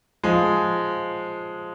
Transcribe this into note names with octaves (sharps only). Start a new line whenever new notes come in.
F3 G#3